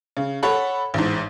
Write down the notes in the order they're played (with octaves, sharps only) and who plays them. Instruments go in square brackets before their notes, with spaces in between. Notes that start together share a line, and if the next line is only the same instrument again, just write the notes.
[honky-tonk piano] C#3
A4 C#5 F#5 B5
A1 G#2